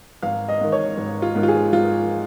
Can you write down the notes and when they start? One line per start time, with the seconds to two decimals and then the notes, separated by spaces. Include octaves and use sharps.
0.23 G#1 F5
0.48 D#5
0.60 G#2 D#3
0.72 C#5
0.98 G#1
1.22 F4
1.35 G#2 D#3
1.43 F4
1.48 G#4
1.72 G#1 F4